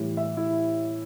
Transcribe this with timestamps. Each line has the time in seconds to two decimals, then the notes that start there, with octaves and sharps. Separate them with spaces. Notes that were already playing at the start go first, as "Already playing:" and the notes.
Already playing: A2 E3 G3
0.17 E5
0.37 E4